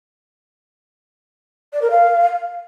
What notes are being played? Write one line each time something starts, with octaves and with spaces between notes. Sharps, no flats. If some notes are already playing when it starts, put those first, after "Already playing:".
D5
A#4
F5